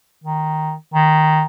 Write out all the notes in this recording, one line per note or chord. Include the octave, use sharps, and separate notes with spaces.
D#3
D#3